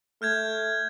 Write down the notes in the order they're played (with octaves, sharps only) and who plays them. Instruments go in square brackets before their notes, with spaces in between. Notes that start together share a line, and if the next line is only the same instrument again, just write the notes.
[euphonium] A3 [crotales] F6 G6 G#6